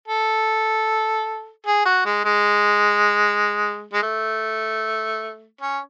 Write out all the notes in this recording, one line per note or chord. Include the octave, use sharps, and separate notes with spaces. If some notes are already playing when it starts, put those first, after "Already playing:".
A4
G#4
F#4
G#3
G#3
G#3
A3
C#4